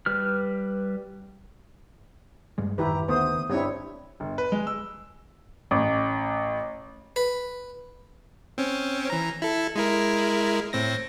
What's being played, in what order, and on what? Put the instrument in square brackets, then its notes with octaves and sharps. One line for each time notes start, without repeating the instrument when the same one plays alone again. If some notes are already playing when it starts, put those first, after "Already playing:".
[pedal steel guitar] G3 B4 F6
[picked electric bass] G2 G3 G#3
[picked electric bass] A1 F#2 D#3 [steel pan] E4 G4 B4 [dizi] A#5
[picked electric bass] D2 D3 D#3 [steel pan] A3 B3 C5 [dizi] D#6
[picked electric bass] G2 [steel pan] G3 C4 E4 [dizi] C#5
[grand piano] G1
B4
G#3
E6
[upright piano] A1
[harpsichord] B4
[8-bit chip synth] C4 C#4
E3 A#5
E4 A4
G#3 E4 A#4
A2 C4 A#6